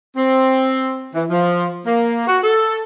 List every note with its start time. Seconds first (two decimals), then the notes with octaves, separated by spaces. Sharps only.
0.16 C4
1.14 E3
1.30 F3
1.86 A#3
2.27 F#4
2.43 A4